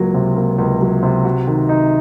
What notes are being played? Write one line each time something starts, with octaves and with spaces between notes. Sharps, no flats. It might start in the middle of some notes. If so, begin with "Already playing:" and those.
Already playing: C#2 F#3 A#3
C3
A#3
C#2
F#3
C3
F#4
D#3
D#4